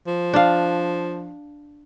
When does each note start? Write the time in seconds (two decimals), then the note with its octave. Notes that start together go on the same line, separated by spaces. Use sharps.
0.07 F3
0.33 D4 F5